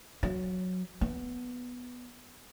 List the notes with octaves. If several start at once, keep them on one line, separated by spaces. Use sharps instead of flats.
F#3
B3